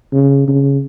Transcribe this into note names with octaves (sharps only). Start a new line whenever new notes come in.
C#3
C#3